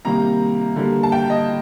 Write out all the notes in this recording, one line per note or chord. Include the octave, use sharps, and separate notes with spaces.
C3 D#3 G3 A#3 A#5
D3 G3 A#3
A5
G5
D#5